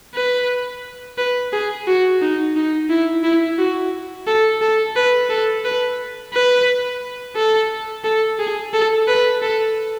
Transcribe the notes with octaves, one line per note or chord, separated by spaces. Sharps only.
B4
B4
G#4
F#4
D#4
D#4
E4
E4
F#4
A4
A4
B4
A4
B4
B4
A4
A4
G#4
A4
B4
A4